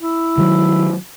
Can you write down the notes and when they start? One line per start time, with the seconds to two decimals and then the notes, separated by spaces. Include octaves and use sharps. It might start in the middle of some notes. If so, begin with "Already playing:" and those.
0.01 E4
0.38 D#3 F3 F#3